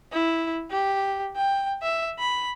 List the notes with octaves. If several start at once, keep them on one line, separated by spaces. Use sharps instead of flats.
E4
G4
G5
E5
B5